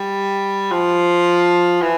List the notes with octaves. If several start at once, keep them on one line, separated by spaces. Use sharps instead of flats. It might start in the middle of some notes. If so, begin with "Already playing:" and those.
Already playing: G3
F3
E3